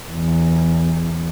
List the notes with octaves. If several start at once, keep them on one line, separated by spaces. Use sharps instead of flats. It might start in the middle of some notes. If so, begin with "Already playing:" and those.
E2